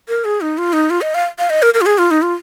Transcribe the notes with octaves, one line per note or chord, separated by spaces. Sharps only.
A#4
G#4
D#4
F4
D#4
F4
D#5
F5
F5
D#5
A#4
A#4
F4
G#4
F4
D#4
F4